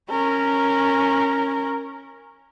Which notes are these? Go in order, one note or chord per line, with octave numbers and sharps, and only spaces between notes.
C#4 A#4